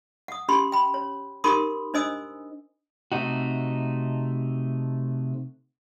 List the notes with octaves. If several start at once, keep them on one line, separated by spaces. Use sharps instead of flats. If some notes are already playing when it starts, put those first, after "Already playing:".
F#5 D#6
C#4 G4 B5 C6
G5 B5
C#5
D#4 G4 A#4 B5 C6 D#6
D4 C5 D#5 G#5 D#6 E6
C3 A3 D#4 F#4